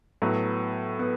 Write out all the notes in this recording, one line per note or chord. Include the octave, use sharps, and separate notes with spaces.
A2 F#3 B3
B3